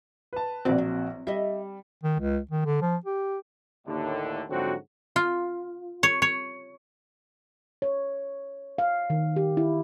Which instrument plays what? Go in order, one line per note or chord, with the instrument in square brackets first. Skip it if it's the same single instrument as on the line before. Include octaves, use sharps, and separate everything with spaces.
[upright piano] B4 A5
[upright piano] A#1 F#4 [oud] B2 E3 D5 [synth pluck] C4
[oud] F#3
[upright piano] G3 [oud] D#5 E5
[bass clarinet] D#3
C#2
D#3
D3
F3
G4
[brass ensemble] D#2 A2 D3
G#2 D3 F3 F#3 C4 F#4
[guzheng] F4
C#5
C#5
[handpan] C#5
F5
D#3
G4
E4